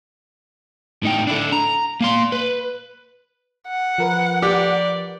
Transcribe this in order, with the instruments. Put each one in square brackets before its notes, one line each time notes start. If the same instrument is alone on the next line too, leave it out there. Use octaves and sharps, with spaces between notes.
[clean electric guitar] A2 D#4 G5
D4 E4 A4
A#5
A#3 F5 C6
B4
[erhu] F#5
[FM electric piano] F3 A#4 B4
[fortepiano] G4 [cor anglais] D5